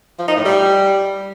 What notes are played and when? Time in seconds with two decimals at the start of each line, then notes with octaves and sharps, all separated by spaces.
0.19 F3
0.28 D#4
0.36 A2
0.45 G3